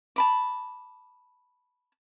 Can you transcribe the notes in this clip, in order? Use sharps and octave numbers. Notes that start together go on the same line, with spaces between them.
A5 B5 D6